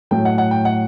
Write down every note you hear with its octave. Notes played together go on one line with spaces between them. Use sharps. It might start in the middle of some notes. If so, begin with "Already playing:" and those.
A2 F#3 A3 G5
F#5
F#5
G5
F#5